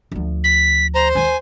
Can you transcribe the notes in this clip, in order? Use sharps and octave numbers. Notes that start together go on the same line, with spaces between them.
D2 F3
B6
C5 A#5
D#2 D#3 G#5